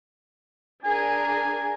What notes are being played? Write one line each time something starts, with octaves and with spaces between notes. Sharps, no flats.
D4 G#4 A#4 G#5